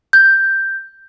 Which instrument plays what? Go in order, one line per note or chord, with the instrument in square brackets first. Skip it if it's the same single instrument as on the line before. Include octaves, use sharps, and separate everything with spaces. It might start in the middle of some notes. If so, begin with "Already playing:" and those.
[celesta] G6